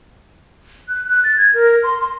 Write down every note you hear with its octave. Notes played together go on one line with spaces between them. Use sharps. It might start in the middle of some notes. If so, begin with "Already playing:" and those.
F#6
F#6
A6
G#6
A#4
C6
C6